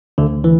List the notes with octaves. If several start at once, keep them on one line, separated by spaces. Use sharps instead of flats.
D2 D3
E3